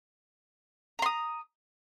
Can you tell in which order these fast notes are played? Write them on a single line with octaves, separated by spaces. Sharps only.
A#5 C6 D#6